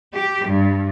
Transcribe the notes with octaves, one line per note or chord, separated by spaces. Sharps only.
G4
G2